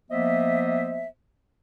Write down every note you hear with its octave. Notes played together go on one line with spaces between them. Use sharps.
F3 A#3 B3 C5 D#5 E5